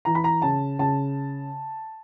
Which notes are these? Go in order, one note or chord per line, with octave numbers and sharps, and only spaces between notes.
E3 A#5
B5
A#5
C#3 A5
C#3 A5